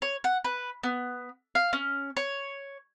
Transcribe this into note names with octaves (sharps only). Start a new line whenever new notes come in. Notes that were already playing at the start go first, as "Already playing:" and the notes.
C#5
F#5
B4
B3
F5
C#4
C#5